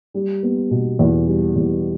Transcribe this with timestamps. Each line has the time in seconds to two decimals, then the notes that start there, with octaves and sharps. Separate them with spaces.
0.14 G3
0.43 B3
0.71 B2
0.99 E2
1.27 G3
1.56 E2